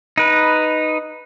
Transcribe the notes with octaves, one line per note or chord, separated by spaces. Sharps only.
D#4 B4